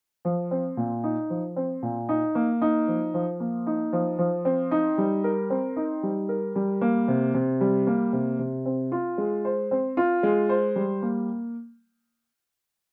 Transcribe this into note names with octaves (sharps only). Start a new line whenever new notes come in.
F3
C4
A#2
D#4
F3
C4
A#2
D#4
A#3
D#4
F3
F3
A#3
D#4
F3
F3
C4
D#4
G3
A#4
C4
D#4
G3
A#4
G3
A#3
C3
C3
G3
A#3
C3
C3
C4
F4
G#3
C5
C4
F4
G#3
C5
G3
A#3